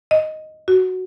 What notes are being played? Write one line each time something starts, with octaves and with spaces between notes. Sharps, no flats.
D#5
F#4